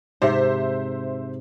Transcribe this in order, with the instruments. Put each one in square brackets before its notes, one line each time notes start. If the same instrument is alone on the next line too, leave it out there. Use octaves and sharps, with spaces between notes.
[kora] G#2 C3 [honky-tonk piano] C5 E5